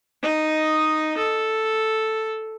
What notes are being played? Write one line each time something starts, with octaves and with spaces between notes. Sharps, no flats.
D#4 D#5
A4